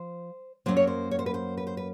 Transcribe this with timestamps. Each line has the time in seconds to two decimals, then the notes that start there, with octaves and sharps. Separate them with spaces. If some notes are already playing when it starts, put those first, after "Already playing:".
Already playing: F3 C5
0.66 F#2 C#3 F#3 A#3 C5
0.77 C#5
0.87 C5
1.11 C#5
1.19 C5
1.26 B4
1.34 C5
1.57 B4
1.67 C5
1.77 B4